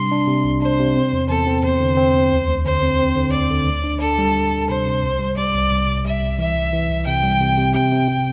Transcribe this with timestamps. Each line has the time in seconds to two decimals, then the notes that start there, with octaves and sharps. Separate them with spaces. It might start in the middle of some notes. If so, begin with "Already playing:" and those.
Already playing: C3 G3 D4 C6
0.11 D4
0.27 C3
0.44 C2
0.61 D4 C5
0.79 C3
0.96 C4
1.13 E2
1.29 E2 A4
1.47 C4
1.64 E2 C5
1.80 D3
1.97 C4
2.14 E2
2.31 D2
2.48 D2
2.65 D3 C5
2.83 C4
2.99 C4
3.16 D3
3.33 D2 D5
3.50 D3
3.67 D2
3.84 D4
4.01 D4 A4
4.18 G3
4.36 G3
4.52 G3
4.68 C3 C5
4.85 C3
5.03 C2
5.19 G3
5.37 G3 D5
5.54 C2
5.71 C2
5.88 C3
6.05 G3 E5
6.22 C2
6.39 E3 E5
6.56 C2
6.72 E3
6.90 C2
7.06 C3 G5
7.23 G3
7.40 C3
7.57 C3
7.75 C3 G5
7.92 C3
8.08 C3